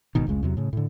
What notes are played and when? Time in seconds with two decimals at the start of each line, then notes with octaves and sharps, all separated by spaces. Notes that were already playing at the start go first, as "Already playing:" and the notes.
0.15 F1 G#2 B2 D#3
0.27 F1 C#2 C#3 G#3
0.43 E2 C3 F#3
0.57 A2 C#3
0.73 A2 D3